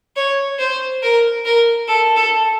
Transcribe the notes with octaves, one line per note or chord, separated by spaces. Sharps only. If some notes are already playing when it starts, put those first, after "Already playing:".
C#5
C5
A#4
A#4
A4
A4